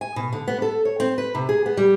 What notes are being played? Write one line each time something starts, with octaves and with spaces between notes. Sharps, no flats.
G#5
B2
D3
B3
A4
C#5
C4
B4
C3
G#4
B3
G3